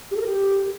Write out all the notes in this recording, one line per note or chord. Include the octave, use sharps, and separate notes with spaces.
G4
A4
A#4
G4